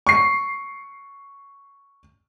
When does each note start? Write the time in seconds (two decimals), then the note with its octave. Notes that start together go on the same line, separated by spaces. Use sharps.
0.07 C#6 C7